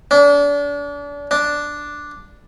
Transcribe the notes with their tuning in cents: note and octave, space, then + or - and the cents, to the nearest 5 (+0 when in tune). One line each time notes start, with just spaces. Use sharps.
D4 -35
D4 +0